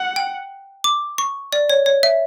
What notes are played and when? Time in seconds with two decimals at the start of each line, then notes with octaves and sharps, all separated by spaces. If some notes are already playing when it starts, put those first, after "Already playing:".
Already playing: F#5
0.16 G5
0.84 D6
1.18 C#6
1.53 D5
1.70 C#5
1.86 C#5
2.03 E5